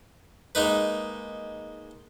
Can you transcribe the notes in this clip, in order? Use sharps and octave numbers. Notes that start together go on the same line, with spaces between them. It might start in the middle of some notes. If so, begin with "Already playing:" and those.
G#3 A#3 D#4 B4